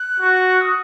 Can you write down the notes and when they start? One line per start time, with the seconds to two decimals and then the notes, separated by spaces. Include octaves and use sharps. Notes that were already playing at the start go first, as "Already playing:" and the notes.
Already playing: F#6
0.20 F#4
0.61 D#6